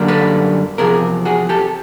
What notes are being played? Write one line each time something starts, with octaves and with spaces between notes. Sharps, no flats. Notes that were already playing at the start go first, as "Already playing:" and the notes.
Already playing: F#2 D3 G3 A#3
A4 B4
E2 C3 F3 G#4 A#4
F#4 G#4
G4 A4